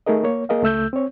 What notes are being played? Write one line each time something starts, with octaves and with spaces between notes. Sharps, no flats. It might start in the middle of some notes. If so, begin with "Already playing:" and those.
A3 D#4 G#4 A#4 D#5
A#3 C#5
A#3 G#4 A#4 D#5 F5
C#2 A3 E6 G6
C4 C#5